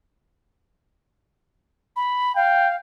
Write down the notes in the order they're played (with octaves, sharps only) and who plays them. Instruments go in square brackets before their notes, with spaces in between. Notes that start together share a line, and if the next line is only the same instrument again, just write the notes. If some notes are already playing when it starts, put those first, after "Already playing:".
[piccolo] B5
[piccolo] F5 [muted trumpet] G5